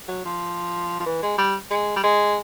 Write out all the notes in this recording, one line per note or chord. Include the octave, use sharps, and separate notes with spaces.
F#3
F3
F3
E3
G#3
G3
G#3
G3
G#3